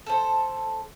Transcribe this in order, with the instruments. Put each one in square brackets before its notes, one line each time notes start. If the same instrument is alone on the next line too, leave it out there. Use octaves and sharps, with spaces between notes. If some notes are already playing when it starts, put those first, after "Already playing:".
[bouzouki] A4 C5